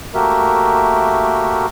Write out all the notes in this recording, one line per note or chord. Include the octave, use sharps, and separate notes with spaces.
A3 A#3 F#4 G4 A#4 E5